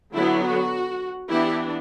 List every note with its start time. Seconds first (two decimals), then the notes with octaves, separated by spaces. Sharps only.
0.13 D3 F#3 B3 E4
0.42 F#4
1.29 E3 B3 D4 E4 G4